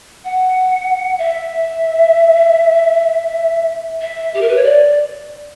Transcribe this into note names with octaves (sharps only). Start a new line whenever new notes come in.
F#5
E5
E5
G4
A#4
B4
C#5
D5